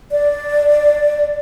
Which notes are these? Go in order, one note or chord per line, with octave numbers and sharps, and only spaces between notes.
D5